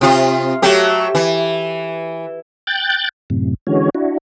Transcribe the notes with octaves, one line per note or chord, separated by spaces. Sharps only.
C3 F4
F#3 A3 G4
E3
G5 F#6 G6 A6
F#2 A2 C3
D3 E3 G#3 C#4 F#4 C#5
D4 E4 F#4